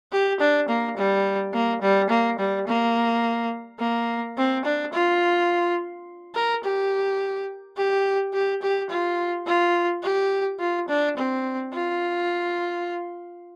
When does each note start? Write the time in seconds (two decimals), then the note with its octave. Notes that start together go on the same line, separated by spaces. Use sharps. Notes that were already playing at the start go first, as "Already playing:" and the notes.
0.12 G4
0.40 D4
0.69 A#3
0.97 G3
1.54 A#3
1.82 G3
2.10 A#3
2.39 G3
2.67 A#3
3.80 A#3
4.37 C4
4.65 D4
4.93 F4
6.35 A#4
6.63 G4
7.77 G4
8.34 G4
8.62 G4
8.90 F4
9.47 F4
10.03 G4
10.60 F4
10.88 D4
11.17 C4
11.73 F4